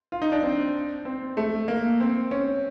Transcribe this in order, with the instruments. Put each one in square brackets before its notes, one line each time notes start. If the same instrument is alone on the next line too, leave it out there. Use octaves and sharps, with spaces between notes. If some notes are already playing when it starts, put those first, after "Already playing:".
[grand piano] F4
D#4
D4
C4
C4
A3
A#3
C4
C#4